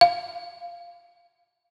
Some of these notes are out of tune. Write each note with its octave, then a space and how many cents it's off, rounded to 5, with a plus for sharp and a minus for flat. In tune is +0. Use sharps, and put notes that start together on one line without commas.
F5 -5